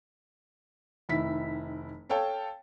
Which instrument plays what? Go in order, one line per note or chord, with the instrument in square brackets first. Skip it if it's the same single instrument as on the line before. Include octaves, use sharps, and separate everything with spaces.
[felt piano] F1 D#3 E4 B6
A4 C#5 F5 G5 A5